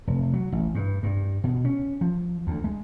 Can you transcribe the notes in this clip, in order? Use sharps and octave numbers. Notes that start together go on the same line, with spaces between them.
F1
F#3
A1
G2
G2
B2
C#4
F3
D2
G#3